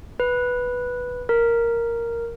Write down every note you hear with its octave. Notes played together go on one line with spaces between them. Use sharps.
B4
A#4